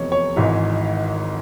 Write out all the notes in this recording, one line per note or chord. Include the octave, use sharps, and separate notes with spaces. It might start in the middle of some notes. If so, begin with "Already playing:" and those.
Already playing: F1 E2 C3 C#5
C#5
G#1 G#2 E3